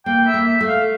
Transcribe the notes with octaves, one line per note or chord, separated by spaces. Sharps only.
A#3 G5
E5
A#3
E5
A3
F5